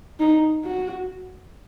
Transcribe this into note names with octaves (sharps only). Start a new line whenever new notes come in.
D#4
F#4